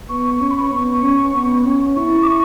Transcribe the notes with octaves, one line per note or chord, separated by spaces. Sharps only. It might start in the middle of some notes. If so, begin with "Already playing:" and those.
B3 C#6
C#4 C#6
B5
C#6
B3
C#4
B3
C#4
E4 C#6
D6
C#6